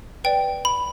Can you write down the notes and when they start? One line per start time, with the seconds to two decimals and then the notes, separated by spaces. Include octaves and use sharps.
0.24 B4 D5 G5
0.65 B5